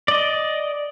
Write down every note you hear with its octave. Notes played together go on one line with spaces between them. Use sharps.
D5 D#5